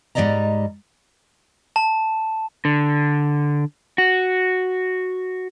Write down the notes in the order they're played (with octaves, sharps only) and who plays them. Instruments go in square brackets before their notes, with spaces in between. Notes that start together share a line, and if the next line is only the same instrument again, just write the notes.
[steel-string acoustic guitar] G#2 G3 G#3 D5 D#5 A#5
[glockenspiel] A5
[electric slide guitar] D3
F#4